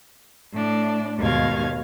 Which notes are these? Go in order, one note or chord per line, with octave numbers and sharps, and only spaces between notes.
A2 D4
D#2 G#2 B2 F5 G#6